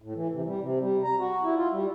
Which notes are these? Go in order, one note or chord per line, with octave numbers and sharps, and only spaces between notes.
A2
E3
C3
G3
C3
G3
A#5
F#4
E4
F4
G3